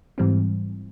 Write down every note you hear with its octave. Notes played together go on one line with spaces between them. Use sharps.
G#2 E3 G3 C4